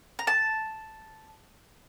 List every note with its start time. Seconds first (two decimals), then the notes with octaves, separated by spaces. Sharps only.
0.19 A#5
0.27 A5